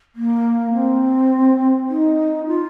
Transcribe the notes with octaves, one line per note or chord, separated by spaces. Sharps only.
A#3
C4
D#4
F4